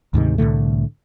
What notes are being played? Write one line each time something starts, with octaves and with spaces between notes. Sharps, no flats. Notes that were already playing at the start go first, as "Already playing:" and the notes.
D2 G#2 C3 D#3
C2 A2 D3 A3